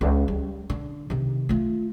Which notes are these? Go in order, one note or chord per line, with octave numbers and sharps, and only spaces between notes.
C#2
G3
D3
C3 D#3
A3 F4